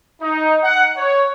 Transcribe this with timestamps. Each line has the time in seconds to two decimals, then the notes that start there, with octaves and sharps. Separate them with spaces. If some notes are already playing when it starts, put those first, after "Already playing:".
0.22 D#4
0.63 F#5
0.97 C#5